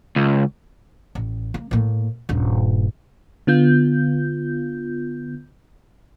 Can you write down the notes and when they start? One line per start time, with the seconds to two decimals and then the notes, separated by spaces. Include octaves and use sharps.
0.16 C#2
1.15 A1
1.54 A#3
1.71 A2 A#3
2.29 D#1 G2
3.47 D3 B3 F4 G6